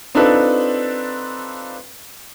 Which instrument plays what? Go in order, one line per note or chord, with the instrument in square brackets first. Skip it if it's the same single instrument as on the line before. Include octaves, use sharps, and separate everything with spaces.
[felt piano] C4 D4 D#4 F4 A4 B4